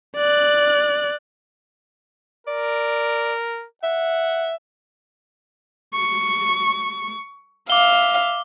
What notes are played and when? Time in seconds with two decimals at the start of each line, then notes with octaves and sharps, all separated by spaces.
0.17 D5 F#6
2.47 A#4 D5
3.83 E5 F#5
5.94 C#6
7.70 E5 F5 D6 G7